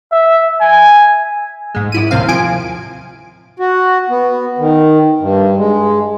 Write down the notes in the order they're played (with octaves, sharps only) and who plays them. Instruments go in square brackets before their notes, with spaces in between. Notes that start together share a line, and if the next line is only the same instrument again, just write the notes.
[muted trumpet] E5
G#5
[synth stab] G#2 G#3
F#2 E4 D#7
D#2 A2 C3 C4 F5
F3 G#5 D7
[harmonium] F#4
B3
D#3
G2
G#3